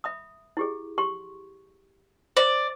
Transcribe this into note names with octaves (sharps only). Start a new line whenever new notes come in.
E5 B5 D#6
E4 G4 G#4
G4 C6 C#6
C5 D5 E5